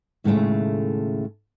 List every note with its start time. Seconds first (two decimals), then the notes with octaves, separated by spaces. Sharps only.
0.24 D#2 A2 C#3 G#3 A3